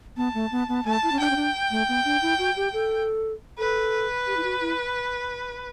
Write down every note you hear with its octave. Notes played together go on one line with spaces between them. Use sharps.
B3 A5
A3
B3
B3
A3 A5
E4
C#4
D4 G5
C#4
D4
A3
B3
D4
E4
F#4
G4
A4
A4 B4
G4
E4
F#4
E4